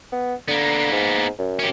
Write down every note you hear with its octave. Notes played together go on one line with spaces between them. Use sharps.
B3
D3 A#3 B3
G#2
F#2
C#4 G4